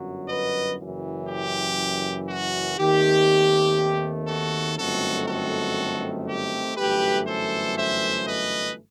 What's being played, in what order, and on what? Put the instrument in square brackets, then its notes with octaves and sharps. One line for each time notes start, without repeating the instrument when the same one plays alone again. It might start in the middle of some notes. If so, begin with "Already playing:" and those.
Already playing: [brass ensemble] G1 F#2 F#3
B4 D#5
F#1 F#2 E3
G4
F#4
D#2 D#3 A3 C4 G4
F#4 A4
G1 F#2 D#3 A3 C4 F#4 A4
F#4 A4
G4
G1 F#2 E3 A3 G4 B4
A4 C5
C5 E5
B4 D#5